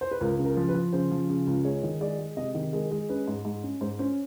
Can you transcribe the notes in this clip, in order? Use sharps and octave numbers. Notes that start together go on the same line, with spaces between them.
C5
B4
C#2 A#4
C#3
A#4
F3
B4
F3
C#3 C5
F3
C#3
C#2
G#3 C#5
D#3
G#3 D5
G#3
C3 D#5
D#3
G#3 A#4
G#3
C#4 B4
G#2
G#2
C#4
G#2 C5
C#4 C5